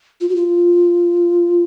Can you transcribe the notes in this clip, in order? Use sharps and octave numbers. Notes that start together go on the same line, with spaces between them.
F4
F#4
F4